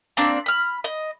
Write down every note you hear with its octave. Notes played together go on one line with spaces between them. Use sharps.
A#3 C4 D4
B5 F6
D#5